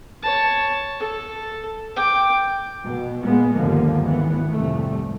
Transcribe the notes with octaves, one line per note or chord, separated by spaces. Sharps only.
C#5 A5
A4
G5 D6
B2
A#2 G#3 B3
G1 D#2 D3 F3 A#3
G#1 E3 B3
C2 F2 A3